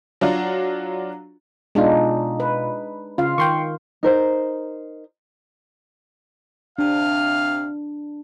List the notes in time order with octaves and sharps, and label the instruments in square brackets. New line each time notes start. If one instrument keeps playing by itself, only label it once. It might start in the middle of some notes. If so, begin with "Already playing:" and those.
[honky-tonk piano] F#3 D4 F4 F#4
[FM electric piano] B2 F4 [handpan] G#3 D4 D#4
[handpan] B4
[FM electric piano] C#3 [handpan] F4 F5
[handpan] D#3 [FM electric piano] G5 C6 C#6
[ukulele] D#4 A#4 C5
[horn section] C3 F5 [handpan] D4